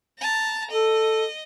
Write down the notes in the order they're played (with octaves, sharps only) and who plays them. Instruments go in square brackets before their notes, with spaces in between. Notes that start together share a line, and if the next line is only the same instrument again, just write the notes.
[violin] A5 A#5
[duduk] A4 [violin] D#5